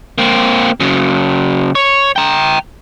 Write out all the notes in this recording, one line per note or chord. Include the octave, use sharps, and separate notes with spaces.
A#3 C4
C#3 F#3
C#5
G5 A#5